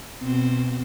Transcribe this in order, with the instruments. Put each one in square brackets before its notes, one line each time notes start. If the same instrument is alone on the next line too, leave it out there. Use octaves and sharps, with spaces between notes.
[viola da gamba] B2 C4